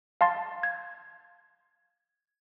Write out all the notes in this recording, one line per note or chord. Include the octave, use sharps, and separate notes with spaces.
F5 A5 C6 A6
G#6